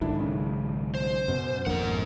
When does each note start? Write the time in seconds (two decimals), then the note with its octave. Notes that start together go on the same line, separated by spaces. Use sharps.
0.01 B1 G#2 D3 D#3 D4 E4
0.20 C#3
0.95 C5
1.28 F#2 B2
1.66 G#1 F2 G#2 A#3 D4 F#5